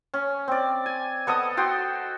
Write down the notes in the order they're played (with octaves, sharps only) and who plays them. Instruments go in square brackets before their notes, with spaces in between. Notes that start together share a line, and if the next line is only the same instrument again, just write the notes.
[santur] C#4
C4 D5
G#5
B3 A4 D#5 D#6
F#4 G5 C6